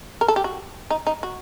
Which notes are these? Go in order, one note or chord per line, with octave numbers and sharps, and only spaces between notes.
A#4
A4
G4
F#4
D#4
D#4
F#4